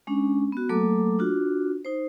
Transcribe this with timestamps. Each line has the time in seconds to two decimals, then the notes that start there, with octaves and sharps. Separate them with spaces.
0.07 G#3 C#4 D4
0.52 B3 F#4
0.69 F#3 A3 A#3 A4 D6
1.19 D4 F4 F#4
1.85 D#4 C5